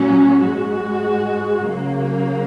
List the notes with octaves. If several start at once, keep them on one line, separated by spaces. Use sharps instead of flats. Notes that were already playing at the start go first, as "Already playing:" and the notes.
Already playing: A#2 F#3 C#4
G#2 G#3 F#4
C#3 F#3 A#3